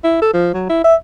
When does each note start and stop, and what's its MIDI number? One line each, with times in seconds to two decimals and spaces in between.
0.04 0.20 64
0.22 0.30 69
0.34 0.51 53
0.54 0.65 54
0.70 0.82 64
0.84 0.95 76